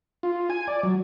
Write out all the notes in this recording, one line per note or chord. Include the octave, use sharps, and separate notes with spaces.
F4
G#5
D5
F#3